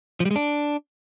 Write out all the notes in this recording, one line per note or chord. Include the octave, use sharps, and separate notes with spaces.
F3
G3
G#3
D4